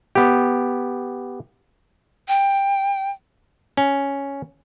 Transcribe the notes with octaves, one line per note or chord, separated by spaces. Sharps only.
B3 G4
G5
C#4